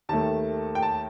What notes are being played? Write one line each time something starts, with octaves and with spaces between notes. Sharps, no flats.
D#2 D#3 A3 A5
G5
A5